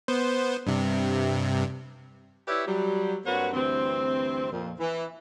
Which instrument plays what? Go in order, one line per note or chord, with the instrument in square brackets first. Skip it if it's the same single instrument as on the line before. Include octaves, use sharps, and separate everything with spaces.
[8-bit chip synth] B3 C5
G2 C3
[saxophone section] E4 G4 B4 C#5 D5 E5
F#3 G3
G2 A#3 C4 F#4 B4 C#5
D2 G2 E3 C4
F2 A#2
E3